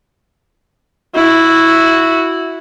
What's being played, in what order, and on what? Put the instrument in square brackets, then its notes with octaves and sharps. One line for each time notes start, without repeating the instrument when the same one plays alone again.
[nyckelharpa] E4 F#4